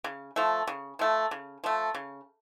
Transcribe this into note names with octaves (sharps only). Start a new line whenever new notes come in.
C#3
F3 A3
C#3
F3 A3
C#3
F3 A3
C#3